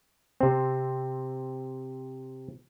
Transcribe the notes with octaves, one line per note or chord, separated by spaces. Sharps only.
C3 C4